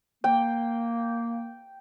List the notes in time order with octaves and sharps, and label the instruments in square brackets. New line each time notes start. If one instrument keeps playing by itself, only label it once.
[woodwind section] A#3 [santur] G5